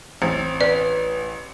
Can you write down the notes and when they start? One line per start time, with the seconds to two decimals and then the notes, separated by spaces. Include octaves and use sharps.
0.22 A1 C4
0.61 B4 D5